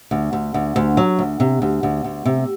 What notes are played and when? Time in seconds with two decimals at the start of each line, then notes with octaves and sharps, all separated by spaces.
0.11 D2
0.33 D2
0.54 D2
0.76 D2
0.97 F#3
1.19 D2
1.40 C3
1.62 D2
1.83 D2
2.04 D2
2.26 C3